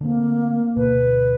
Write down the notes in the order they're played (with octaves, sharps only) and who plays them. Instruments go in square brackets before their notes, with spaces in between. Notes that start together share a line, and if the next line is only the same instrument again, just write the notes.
[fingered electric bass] D3 A3 C4 [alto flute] A#3
[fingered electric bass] D2 B2 [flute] B4